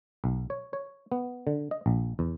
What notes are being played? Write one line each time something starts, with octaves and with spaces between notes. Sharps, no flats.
B1
C#5
C#5
B3
D3
D#5
A#1
E2